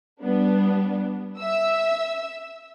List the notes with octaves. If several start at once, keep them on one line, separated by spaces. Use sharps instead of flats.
G3 B3 D4
E5 E6